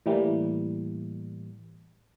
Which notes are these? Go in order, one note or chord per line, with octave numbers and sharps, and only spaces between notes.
A2 E3 G3 A#3